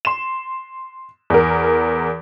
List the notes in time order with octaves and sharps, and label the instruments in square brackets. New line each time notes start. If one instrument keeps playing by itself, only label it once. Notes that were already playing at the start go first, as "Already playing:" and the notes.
[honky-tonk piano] C6 E7
E2 A#4